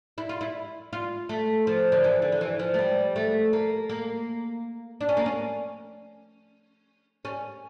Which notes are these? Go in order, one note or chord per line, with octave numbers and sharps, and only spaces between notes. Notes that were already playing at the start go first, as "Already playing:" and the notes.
E4
F4
E4
F4
A3
F3
D3
E3
D3
D3
E3
F3
A3
G3
A3
A#3
A#3
D4
C#4
A#3
C#4
C#4